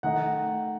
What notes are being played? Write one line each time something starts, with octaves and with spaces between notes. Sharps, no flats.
D#3 A3 D#4 F#5